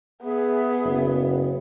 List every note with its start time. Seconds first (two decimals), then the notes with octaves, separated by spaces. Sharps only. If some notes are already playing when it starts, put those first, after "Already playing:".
0.23 B3 G#4 E5
0.85 F#1